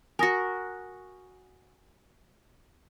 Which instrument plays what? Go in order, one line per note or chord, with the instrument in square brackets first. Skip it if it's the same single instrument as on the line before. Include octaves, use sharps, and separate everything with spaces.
[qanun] F#4 A#4 [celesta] G#5 D#6 A#6